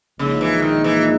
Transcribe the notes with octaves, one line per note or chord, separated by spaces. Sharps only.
A#1 A#2 C#3 G#3 D#4
E3
D#3
E3